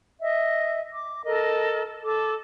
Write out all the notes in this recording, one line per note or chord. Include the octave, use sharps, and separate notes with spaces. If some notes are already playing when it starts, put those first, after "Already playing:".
D#5 E5
D6
A4 A#4 D#5
A4 D6